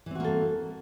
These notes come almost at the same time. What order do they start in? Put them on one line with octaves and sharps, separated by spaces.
E3 C4 F#4 A#3 A4